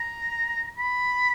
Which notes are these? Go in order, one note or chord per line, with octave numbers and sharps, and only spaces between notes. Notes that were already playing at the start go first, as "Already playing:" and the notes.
Already playing: A#5
B5